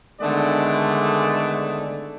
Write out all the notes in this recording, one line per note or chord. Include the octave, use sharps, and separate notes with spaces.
D3 D#3 G#3 A3 B3 D5